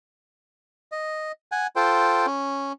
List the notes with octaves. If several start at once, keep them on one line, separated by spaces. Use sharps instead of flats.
D#5
F#5 G#5
F4 A4 C5 G5
C#4